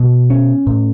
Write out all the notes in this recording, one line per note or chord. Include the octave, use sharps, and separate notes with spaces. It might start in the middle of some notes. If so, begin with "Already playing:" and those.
Already playing: B2
C#4
A2